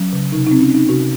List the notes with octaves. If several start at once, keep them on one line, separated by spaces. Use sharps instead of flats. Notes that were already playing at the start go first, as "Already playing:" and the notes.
Already playing: F#3 C#4
C#3
C3 D#4
C4 D#4
C#4
C4 D#4
C3 F#4